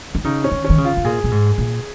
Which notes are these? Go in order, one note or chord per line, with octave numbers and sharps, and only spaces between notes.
D#3
C#3 D#4
C#4
D#3
C#4
D#3
C#3
F4
C#3
A#2 G#4
A#2
G#2
A#2